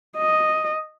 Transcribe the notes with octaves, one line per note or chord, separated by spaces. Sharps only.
D#5